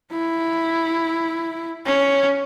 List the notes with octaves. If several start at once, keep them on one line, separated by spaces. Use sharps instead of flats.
E4
C#4